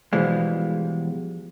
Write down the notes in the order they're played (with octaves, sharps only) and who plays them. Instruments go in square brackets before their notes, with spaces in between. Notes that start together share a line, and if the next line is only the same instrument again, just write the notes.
[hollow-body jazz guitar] B2 E3 F3 G3 G#3